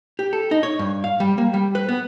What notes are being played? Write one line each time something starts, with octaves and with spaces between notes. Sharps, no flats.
G4
A4
D#4
C#5
G2
F5
G3
A#3
G3
B4
B3